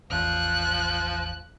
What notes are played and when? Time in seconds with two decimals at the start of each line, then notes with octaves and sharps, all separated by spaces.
0.10 A1 E2 F3 F#6